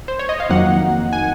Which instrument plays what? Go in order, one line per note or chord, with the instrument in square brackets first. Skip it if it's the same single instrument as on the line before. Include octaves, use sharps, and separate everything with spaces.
[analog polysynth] C5
C#5
D#5
F5
F2 D#3 F#3 A#3 D#4 F#5
G#5